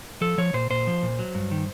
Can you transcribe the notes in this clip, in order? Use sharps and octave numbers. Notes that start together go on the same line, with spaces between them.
F3 A4
F3 C#5
A#2 C5
A#2 C5
F3
A#2
F#3
G2
D#3